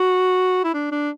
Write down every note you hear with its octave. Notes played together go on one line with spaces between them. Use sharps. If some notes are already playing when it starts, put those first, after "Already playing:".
Already playing: F#4
E4
D4
D4